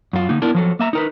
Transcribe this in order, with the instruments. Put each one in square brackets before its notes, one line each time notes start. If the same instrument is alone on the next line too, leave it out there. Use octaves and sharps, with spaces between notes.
[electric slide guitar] F#2 F4
D3 A#3 D#4
B3 D4 E4 A#4
F3 F#3 A4
A#3 E5 A#5
D#4 A#4 B4